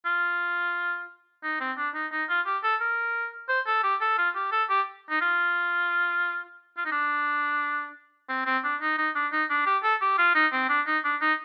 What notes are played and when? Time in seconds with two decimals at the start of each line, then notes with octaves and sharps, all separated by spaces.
0.06 F4
1.43 D#4
1.60 C4
1.77 D4
1.95 D#4
2.12 D#4
2.29 F4
2.46 G4
2.63 A4
2.81 A#4
3.49 C5
3.66 A4
3.83 G4
4.01 A4
4.18 F4
4.35 G4
4.52 A4
4.69 G4
5.10 D#4
5.21 F4
6.77 F4
6.85 D#4
6.91 D4
8.29 C4
8.46 C4
8.64 D4
8.81 D#4
8.98 D#4
9.15 D4
9.32 D#4
9.50 D4
9.66 G4
9.83 A4
10.01 G4
10.18 F4
10.35 D#4
10.52 C4
10.69 D4
10.87 D#4
11.04 D4
11.21 D#4